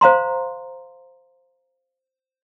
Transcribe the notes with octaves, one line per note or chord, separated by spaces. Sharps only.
C5 F5 A#5 C6